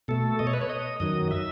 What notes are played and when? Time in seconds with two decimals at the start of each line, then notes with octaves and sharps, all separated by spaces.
0.08 B2 A3 A4
0.39 D#5
0.47 C#5
0.54 B4
0.61 C#5
0.70 D#5
1.00 F#2 D#3 F#3 D#5
1.31 E5